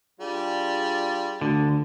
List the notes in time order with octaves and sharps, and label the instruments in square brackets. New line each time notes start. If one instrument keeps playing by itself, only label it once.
[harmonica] G3 [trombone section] D4 F4 G#4
[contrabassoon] D2 [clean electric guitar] D3